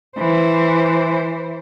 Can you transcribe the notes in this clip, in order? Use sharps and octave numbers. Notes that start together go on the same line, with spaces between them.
E3 C5